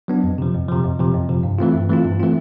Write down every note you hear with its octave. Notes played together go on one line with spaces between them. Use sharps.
F#3 B3 D4
F2
C3 F3
F2
C3 F3
F2
C3 F3
F2
C3 F3
G2
E3 A3 C4 F4
G2
E3 A3 C4 F4
G2
E3 A3 C4 F4